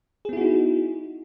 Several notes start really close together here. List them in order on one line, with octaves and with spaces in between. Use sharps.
G#4 B3 E4 F#4 D#4